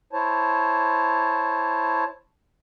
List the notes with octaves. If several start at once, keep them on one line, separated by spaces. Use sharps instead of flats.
E4 C5 C#5 A5